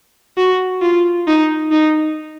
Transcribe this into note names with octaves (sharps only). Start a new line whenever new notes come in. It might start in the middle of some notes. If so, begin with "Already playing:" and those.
F#4
F4
D#4
D#4